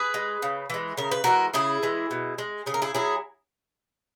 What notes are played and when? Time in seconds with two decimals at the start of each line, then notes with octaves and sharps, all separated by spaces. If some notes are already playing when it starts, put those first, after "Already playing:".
Already playing: G#4 B4
0.14 G#3
0.42 C#3
0.70 E3 G#3
0.97 C#3 A#4
1.12 B4
1.24 E3 G#3 F#4 A#4
1.54 C#3 E4 G#4
1.83 E3 G#3
2.11 B2
2.38 G#3
2.66 C#3 G#4
2.74 A#4
2.82 E4 G#4
2.95 F#3 E4 G#4